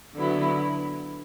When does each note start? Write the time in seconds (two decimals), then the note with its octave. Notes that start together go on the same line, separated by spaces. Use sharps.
0.15 D3 F#3 B3 E4